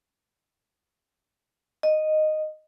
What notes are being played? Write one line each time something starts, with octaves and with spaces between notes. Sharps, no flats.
D#5